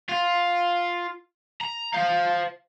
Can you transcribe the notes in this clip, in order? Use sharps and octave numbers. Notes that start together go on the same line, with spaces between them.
F4
A#5
C5 F5